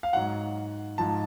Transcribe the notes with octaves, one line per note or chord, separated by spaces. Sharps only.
F5
G#2 F#3 F#5
G#2 F3 A5